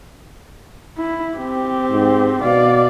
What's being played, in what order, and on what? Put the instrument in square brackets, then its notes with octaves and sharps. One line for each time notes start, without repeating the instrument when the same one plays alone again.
[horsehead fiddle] E4
C4 G4
[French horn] G#2
[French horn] B2 [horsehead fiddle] D5 F5